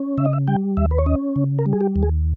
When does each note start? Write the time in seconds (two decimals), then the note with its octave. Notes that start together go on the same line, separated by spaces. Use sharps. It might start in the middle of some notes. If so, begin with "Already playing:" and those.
Already playing: C#4
0.18 C#3 E5
0.25 D#5
0.33 E5
0.47 G3 G5
0.77 D#2 E5
0.91 B4
0.98 C#5
1.06 C#4 D#5
1.36 C#3
1.59 A#4
1.66 G3
1.73 G#4
1.81 G4
1.96 D#2
2.03 G#4